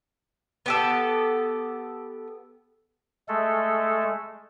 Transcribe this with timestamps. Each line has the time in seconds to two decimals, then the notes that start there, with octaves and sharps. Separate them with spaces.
0.66 B3 G4 A4
3.28 G#3 A3 A4